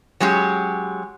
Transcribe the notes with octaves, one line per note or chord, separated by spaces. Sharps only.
F#3 G#3 C#4 G4